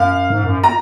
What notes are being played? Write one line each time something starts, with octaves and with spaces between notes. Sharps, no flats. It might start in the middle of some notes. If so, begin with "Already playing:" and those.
Already playing: F#2 F5
G#2
F#2
A#5